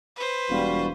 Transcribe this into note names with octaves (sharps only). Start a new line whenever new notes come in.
B4 C5
E1 G3 F4 F#4